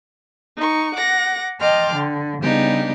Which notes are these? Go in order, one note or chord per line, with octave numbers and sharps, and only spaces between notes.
D#4 C#6
F#5 D6 A#6
D#5 G5 A5 C6 D6 F6
D3
C#3 G3 B3 D4 D#4 G4